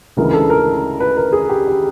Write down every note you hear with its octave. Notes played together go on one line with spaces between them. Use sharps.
D2 C#3 E3 G#3 A#4
A4
A#4
B4
A#4
G#4
G4
G4